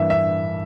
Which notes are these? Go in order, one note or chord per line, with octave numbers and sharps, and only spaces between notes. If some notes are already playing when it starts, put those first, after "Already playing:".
Already playing: G2 E3 A#3 E5
E5